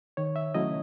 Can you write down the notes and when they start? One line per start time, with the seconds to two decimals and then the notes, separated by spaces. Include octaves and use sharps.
0.17 D#3 C#5
0.36 E5
0.54 F#3 A3 C#4 E4 D#5